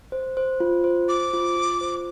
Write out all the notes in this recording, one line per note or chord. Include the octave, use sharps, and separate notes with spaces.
C5
C5
F4
C5
C5 D6
F4
F4
C5